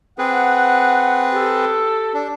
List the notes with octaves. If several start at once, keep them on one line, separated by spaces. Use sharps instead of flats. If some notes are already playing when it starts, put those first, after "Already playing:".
C4 G#4 B4 F#5
G4 A4
D4